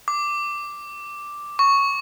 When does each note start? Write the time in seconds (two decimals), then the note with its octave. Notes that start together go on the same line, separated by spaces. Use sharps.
0.08 D6
1.59 C#6